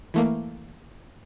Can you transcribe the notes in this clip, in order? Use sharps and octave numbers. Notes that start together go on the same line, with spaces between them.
E3 A3 A#3